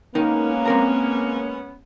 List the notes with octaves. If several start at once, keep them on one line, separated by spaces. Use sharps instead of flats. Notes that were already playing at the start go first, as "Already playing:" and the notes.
G#3 A#3 B3 C#4 D#4 A#4
C4 A#4 A#5